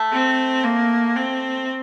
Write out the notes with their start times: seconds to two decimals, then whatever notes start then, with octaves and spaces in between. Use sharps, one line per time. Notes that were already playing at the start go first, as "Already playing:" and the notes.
Already playing: A3
0.12 C4
0.64 A#3
1.16 C4